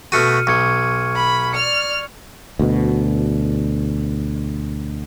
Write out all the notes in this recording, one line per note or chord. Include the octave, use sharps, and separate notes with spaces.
B2 A3 F#4 F6 C#7 D#7
B1 C#6 G#6 C#7
B5
D5 F6 C#7
D2 B2